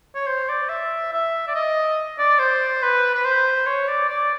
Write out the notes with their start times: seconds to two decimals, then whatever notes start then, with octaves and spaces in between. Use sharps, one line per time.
0.15 C#5
0.27 C5
0.49 D5
0.69 E5
1.12 E5
1.48 D5
1.55 D#5
2.19 D5
2.39 C5
2.82 B4
3.14 B4
3.25 C5
3.66 C#5
3.88 D5
4.09 D5